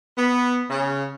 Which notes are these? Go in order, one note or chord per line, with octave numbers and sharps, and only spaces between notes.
B3
C#3